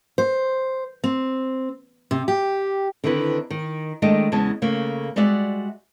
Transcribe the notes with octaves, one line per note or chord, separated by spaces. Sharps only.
C5
C4
C3
G4
D3 D#3 C4 E4 B4
D#3
D#3 G#3 A3 D4 D#5 G5
E2 C#3 G#3 A5
C#3 A3 A#3
G3 G#3 F#4 D5 E5 F#5